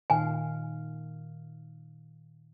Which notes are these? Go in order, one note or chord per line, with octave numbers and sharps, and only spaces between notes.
A#2 D#3 F5 G#5